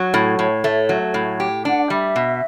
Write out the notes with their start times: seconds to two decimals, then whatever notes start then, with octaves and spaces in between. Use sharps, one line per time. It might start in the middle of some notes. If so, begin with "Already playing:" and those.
Already playing: F#3
0.14 A2
0.39 A2 C#5
0.64 A3
0.89 F#3
1.14 A2
1.40 G4
1.65 D4 F#5
1.82 D5
1.90 G3 E5
2.16 B2